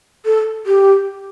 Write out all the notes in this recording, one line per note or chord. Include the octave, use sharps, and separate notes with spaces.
A4
G4